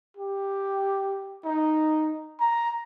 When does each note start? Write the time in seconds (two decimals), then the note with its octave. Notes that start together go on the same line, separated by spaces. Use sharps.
0.17 G4
1.44 D#4
2.40 A#5